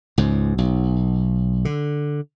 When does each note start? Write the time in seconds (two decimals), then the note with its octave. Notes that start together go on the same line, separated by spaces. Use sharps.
0.18 C#2 G#2
0.58 B1
1.65 D3